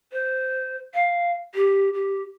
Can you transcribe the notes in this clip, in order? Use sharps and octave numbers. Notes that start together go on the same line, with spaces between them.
C5
F5
G4
G4